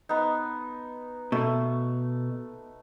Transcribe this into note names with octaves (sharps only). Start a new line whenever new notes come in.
B3 D#4
B2 A3